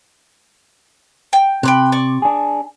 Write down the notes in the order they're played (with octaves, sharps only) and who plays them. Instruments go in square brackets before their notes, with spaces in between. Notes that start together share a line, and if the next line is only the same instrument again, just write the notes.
[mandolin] G5
[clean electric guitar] C3 [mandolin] G5 B5 F#6
[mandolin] D5 C#6
[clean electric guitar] D4 G#4